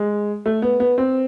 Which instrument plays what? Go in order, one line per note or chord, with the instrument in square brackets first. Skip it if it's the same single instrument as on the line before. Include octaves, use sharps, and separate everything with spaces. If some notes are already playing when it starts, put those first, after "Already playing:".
Already playing: [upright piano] G#3
A3
B3
B3
C4